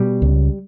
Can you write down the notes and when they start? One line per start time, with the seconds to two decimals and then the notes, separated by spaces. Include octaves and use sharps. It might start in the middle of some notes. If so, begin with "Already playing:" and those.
Already playing: B2 G3
0.22 C#2